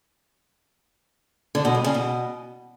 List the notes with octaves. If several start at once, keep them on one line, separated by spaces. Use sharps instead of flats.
D3
B2
G2
C#3
B2